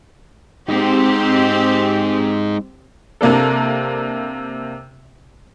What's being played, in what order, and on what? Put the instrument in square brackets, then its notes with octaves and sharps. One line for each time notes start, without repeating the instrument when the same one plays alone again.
[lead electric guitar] G#3 D#4 [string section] C4 G4
[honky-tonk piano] C3 A#3 D4 A4